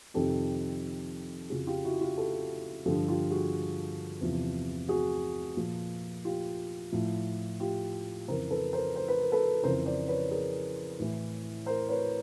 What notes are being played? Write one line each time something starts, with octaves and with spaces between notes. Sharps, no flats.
F2 C3 D#3 G4 A4
F2 C#3 F3 F#4 G#4
F4 G4
E4 F#4
F4 G4
G4 A4
G2 D3 F3 G4 A4
F4 G4
F#4 G#4
E2 C3 F3
F#4 G#4
A#2 F3
F4 G4
A2 F3
F4 G4
F2 C#3 E3 A#4 C5
A4 B4
A#4 C5
C5
B4
A#4
A4 B4
F2 C#3 E3 A#4 C5
C5 D5
B4 C#5
G#4 A#4
A2 E3
A#4 C5
B4 C#5